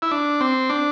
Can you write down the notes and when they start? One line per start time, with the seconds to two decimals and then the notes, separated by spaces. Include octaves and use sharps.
0.02 E4
0.11 D4
0.41 C4
0.70 D4